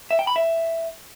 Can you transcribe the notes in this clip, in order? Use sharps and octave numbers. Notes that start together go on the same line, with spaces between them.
E5
G5
B5
E5